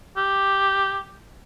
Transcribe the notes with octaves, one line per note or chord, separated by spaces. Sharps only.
G4